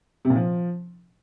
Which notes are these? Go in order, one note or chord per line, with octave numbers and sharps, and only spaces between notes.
C3
A#2
F3